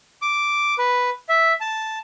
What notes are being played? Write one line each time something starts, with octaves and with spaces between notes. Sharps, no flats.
D6
B4
E5
A5